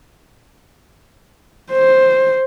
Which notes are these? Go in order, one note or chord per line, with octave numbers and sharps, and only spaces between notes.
C5